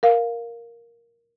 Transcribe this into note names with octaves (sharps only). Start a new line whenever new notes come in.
A#4 F5